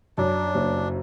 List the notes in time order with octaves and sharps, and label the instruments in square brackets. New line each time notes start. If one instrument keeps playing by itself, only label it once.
[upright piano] F#2 [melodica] D4
[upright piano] F#1